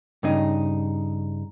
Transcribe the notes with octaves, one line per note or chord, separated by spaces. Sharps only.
G2 C#3 D#4